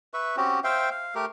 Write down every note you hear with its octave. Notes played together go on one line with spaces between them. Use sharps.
B4 E5 C#6
C4 C#4 F#4 G4
C5 E5 F5 G5
F5
A3 G4 A#4